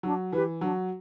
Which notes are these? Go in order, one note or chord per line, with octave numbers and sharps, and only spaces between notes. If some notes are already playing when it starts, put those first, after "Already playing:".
F#3 D4
E3 G4 B4
F#3 D4